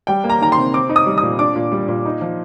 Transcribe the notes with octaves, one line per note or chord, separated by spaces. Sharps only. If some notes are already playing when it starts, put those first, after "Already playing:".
G3 G5
A#3
A#5
D#3 A#5
C3 C6
C4 D6
D#4
D#6
G3
A#2 D#6
D4 D6
A#2
G3
A#2
D#4
F3